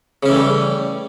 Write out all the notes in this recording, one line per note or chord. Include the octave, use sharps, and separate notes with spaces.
C#3 E3 G3 A3 C#4